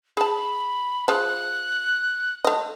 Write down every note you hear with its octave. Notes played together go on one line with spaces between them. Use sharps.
G#4 A5 B5
F3 G#4 F#6
A3 D#5